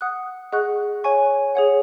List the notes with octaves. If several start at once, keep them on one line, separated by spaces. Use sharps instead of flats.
F#5 D#6 F#6
G#4 D#5 F#5 C#6 F#6
C#5 G#5 C#6
G#4 C#5 F#5